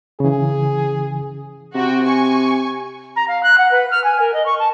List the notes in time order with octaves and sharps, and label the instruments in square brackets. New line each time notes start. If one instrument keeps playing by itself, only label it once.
[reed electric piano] C#3 E3 [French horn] G#4
[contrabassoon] C3 [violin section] F#4 G5
[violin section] G#5 C#6
[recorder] A#5
F5
F#6
F#5
B4
F6
G#5
A#4
D#5
C#6
A5